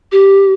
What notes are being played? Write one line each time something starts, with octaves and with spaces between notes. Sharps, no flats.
G4